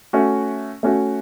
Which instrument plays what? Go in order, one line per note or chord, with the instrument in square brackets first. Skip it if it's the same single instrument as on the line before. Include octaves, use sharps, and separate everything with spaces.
[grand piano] A3 C#4 F#4
A3 C#4 F#4